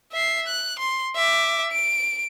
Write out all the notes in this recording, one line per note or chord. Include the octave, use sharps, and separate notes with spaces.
E5 C7
F#6
C6
E5 D6
D7